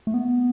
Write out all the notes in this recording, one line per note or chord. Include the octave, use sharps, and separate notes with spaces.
A3
B3